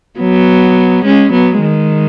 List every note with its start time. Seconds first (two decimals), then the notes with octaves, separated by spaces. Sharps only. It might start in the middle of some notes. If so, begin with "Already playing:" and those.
0.20 F#3 B3
1.05 G#3 C#4
1.33 F#3 B3
1.61 D#3 G#3